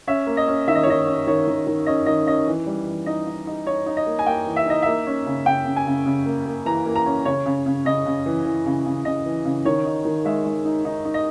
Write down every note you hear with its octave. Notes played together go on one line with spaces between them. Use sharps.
C#4 E5
A#3
D#5
C#4
D#3 E5
D#5
C#5
D#3 D#5
C#4
D#3 C#5
D#3
D#3
C#4 D#5
D#3 D#5
C#4 D#5
E3
G3
E3
D#4 D#5
D#4
D#4
D#4 C#5
D#4
D#5
A#3
G#5
A#3 G5
E3
E5
D#4 D#5
A#3 E5
C#4
C#3
C#3 G5
C#3
G#5
C#3
C#3
A#3
A#3
E3 A#5
A#3
A#5
C#4
C#3 C#5
C#3
C#3
C#3 D#5
C#3
E3
E3
C#3
C#3
C#3 D#5
E3
C#3
D#3 C#5
D#4
D#3
G#3 E5
G#3
D#4
D#4
D#4
D#5